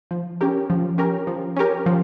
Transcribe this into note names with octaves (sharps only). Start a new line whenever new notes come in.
F3
C#4 G4 A#4
F3
C#4 G4 A#4
F3
C#4 G4 A#4
F3